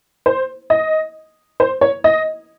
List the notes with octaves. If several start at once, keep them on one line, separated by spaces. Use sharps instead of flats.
C5
D#5
C5
C#5
D#5